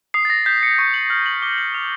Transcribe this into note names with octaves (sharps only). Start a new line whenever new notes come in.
D#6 C7
A6
A#6
G6 B6
C#7
C#6 C#7
F#7
F6 F#7
F#7
D6 G7
F#7
F6 F7